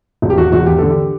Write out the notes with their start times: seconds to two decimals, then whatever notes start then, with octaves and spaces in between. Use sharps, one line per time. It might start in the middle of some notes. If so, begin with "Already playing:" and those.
0.22 E1
0.30 G4
0.37 E2 F#4
0.52 E1 F#4
0.66 E2 G4
0.79 D3 A4
0.90 G4